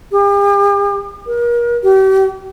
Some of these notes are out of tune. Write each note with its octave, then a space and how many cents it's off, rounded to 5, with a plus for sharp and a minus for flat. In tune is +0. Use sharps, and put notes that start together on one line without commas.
G4 +45
A#4 +35
G4 -35